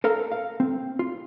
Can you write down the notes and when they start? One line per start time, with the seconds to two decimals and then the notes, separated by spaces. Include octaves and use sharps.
0.04 A4 A#4 F5 A#5
0.32 F5
0.60 C4
0.99 F4